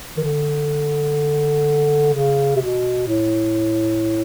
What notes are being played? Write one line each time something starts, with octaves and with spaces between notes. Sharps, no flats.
D#3
D3
C#3
C3
B2
A2